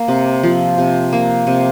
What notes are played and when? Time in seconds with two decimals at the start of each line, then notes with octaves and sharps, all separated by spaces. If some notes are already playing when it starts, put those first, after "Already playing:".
Already playing: A#3
0.08 C3
0.43 F3
0.78 C3
1.13 A#3
1.47 C3